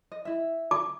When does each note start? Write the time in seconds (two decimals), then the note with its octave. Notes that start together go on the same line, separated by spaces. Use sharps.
0.12 D#5
0.25 E4 E5
0.71 D6